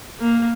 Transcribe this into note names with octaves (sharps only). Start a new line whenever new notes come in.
A#3